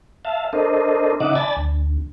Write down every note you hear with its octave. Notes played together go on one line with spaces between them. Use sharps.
E5 F5 A5
D4 A4 A#4 C5 D#5
C#3 D#4 D#5 E5 F#5 D6
D5 G#5 A5 B5 A6
D2